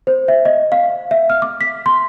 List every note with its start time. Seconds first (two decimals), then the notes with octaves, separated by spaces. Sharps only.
0.07 C5
0.28 E5
0.45 D#5
0.72 F5
1.11 E5
1.30 F6
1.42 D6
1.61 B6
1.86 C6